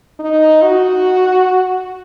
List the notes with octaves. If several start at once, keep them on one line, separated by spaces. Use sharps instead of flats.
D#4
F#4